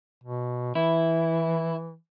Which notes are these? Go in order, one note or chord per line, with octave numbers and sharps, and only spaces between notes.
B2
E3 E4